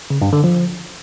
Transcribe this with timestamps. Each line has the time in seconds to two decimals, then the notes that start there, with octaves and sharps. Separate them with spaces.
0.10 C#3
0.22 G2
0.33 D3
0.44 F3